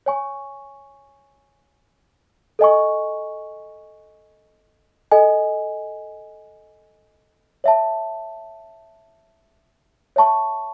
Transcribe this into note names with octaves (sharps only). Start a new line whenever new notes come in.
C#5 G#5 C#6
A4 D#5 G#5 C#6
A4 D#5 G#5
C#5 E5 A5
C#5 E5 A5 C#6